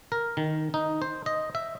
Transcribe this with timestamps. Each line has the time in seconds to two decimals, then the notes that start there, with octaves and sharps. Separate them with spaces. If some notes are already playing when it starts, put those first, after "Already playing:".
0.12 A#4
0.37 D#3
0.74 D#4
1.02 C5
1.26 D#5
1.55 E5